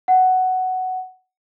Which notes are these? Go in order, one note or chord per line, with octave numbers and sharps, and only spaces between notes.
F#5